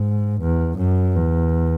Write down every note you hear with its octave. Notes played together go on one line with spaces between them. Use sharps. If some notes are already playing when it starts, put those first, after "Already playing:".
Already playing: G#2
E2
F#2
E2